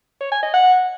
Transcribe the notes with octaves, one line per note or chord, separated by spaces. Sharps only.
C#5
G#5
D#5
F#5